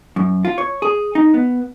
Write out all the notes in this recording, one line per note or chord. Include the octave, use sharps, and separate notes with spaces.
F#2
F4
C#5
G#4
D#4
B3